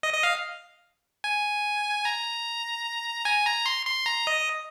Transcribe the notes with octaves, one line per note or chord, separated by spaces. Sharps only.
D#5
D#5
F5
G#5
A#5
G#5
A#5
C6
C6
A#5
D#5